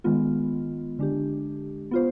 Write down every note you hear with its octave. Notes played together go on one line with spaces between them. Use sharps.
D#3 G#3 B3 F4
D3 G#3 D4 G4
B3 F4 C5